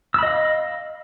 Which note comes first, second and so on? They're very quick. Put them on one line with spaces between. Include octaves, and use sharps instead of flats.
E6 B5 D#5 F5